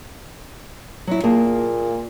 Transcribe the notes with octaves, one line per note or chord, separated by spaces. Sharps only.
F#3 E4
A#2 A#3 G#4 A5